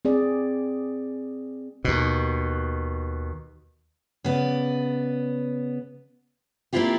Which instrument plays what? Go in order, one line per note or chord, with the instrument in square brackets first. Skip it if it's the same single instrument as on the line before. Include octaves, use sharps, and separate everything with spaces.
[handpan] C4 G#4 D5
[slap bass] D#2 B2
[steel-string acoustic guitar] C#3 B3 D5
A#3 C4 D4 E4 F4 G4